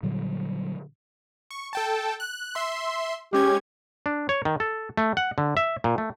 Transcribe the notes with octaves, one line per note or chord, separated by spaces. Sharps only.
A#2 D3 F#3 G3
C#6
A4 G5 A5
F#6
E5 C6
G#3 C#4 G4 G#6
D4
C#5
D#3
A4
A3
F#5
D3
E5
A#2
A3